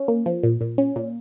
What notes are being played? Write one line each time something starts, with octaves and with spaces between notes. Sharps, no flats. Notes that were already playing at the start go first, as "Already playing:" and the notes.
Already playing: C#4
A#3
F3
A#2
A#2
C#4
A#2